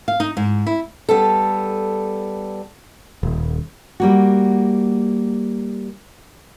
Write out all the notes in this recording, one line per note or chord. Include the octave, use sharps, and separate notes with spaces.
F5
D#4
G#2
E4
G3 B3 A4
D#1
G3 A#3 F#4